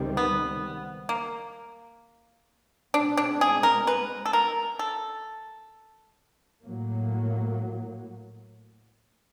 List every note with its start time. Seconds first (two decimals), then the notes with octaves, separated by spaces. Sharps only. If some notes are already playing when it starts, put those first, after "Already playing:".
Already playing: C#2 C3 D#3 G3 C4
0.17 B3
1.09 A#3
2.94 B2 G#3 C4 D4
3.17 D4
3.41 G#4
3.63 A#4
3.87 B4
4.25 A4
4.33 A#4
4.79 A4
6.64 A2 F#3 A#3